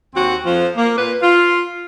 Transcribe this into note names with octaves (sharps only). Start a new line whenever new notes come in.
D#2 C4 F#4
F2 F3
A#3
A#2 B4
F4